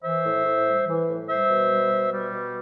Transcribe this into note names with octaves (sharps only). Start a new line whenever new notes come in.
E3 C5 E5
A2
A2
G3
E3
A2
G3 C5 E5
B2
G3
B2
G3
B2